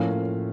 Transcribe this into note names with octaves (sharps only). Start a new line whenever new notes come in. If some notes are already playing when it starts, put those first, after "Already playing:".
Already playing: A2 F3 A#3 C#4 F5